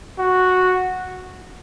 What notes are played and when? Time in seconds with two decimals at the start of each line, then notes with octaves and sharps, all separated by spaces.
0.19 F#4